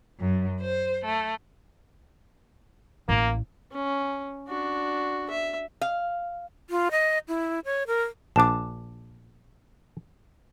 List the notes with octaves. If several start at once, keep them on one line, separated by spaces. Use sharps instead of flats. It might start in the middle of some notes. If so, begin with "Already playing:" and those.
F#2
C5
A3
A1 A#3
C#4
D4 F#4
E5
F5
F4
D#5
E4
C#5
A#4
A#1 D4 A5 D6